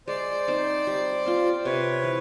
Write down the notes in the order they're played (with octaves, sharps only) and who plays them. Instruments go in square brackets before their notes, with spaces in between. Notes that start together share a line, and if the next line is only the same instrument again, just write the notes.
[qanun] G#3 [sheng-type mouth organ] C5 D5
[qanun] C4 D#4
G3
C4 F4
[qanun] C3 [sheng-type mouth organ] B4 C#5
[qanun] E3